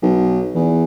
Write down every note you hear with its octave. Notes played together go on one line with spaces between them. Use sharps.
B1
E2